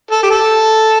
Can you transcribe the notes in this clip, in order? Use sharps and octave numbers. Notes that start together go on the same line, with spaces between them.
A4
G4
A4